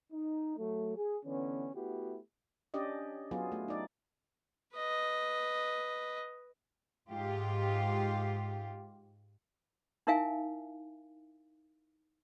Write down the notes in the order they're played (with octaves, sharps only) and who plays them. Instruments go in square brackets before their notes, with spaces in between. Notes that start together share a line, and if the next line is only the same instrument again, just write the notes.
[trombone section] D#4
F#3 A3
G#4
D3 E3 B3 C#4
A3 B3 E4 F#4 G4
[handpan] C#4 D4 G4 D5 D#5
F#3 B3 F4 G#4
A3
D#4 D5
[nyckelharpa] B4 D#5
[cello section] G#2 F4 G4
[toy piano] D#4 E4 A#4 E5 F5 G#5